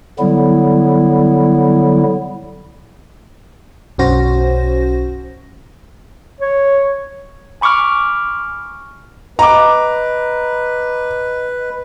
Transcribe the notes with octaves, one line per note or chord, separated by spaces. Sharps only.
D3 F#3 G3 B3 E4
B1 F#2 C#4 F#4 C5 A#6
C#5
G#5 B5 C#6 D6 F6
B4 D#5 A#5 D6